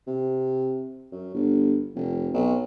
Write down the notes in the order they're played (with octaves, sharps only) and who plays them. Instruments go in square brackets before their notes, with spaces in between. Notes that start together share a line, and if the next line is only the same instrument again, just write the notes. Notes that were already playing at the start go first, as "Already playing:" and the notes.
[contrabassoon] C3
F#2
G1
F1
B1